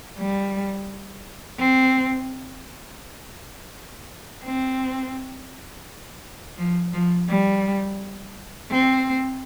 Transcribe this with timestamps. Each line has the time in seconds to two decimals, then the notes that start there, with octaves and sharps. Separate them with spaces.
0.18 G3
1.59 C4
4.44 C4
6.57 F3
6.93 F3
7.29 G3
8.70 C4